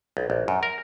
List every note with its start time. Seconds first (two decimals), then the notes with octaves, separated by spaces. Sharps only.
0.17 B1
0.30 A#1
0.48 F#2
0.63 A#4